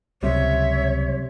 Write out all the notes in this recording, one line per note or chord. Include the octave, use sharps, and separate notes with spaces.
C#2 F#2 C3 G3 C#5 E5